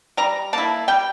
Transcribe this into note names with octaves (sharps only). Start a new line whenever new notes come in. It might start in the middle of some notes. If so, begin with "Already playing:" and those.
G3 A#5
A#3 E4 A5
G3 G5